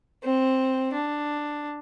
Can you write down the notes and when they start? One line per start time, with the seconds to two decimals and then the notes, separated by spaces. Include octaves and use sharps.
0.23 C4
0.93 D4